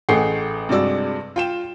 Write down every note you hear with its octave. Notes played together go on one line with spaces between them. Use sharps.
A1 A3 G#4 F#5 G5 C7
G2 C3 G#3 F#4 D5 E6
F4 G5 E7